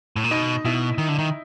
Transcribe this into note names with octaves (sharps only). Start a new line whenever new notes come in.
A2
A#2
B2 D#4
B2 E4
D#3
D3
D#3